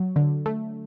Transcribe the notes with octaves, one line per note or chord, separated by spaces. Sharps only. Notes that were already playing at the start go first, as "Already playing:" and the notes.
Already playing: F#3
D3
A3